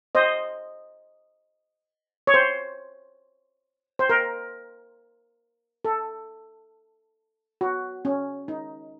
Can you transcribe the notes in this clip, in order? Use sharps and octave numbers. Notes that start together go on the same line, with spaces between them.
C5 D#5
C#5
C5
C5
A#4
A4
F#4
C#4
D#4